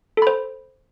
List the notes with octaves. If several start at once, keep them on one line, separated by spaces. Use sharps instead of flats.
A4 C5 B5